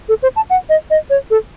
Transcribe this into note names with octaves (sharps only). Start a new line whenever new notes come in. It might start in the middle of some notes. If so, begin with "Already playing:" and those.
A4
C5
A5
F#5
D#5
D#5
C#5
A4